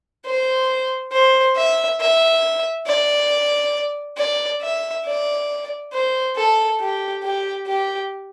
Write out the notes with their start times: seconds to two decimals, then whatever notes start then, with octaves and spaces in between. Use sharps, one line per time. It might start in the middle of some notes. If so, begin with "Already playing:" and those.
0.26 C5
1.12 C5
1.56 E5
2.00 E5
2.87 D5
4.17 D5
4.62 E5
5.05 D5
5.93 C5
6.36 A4
6.80 G4
7.23 G4
7.67 G4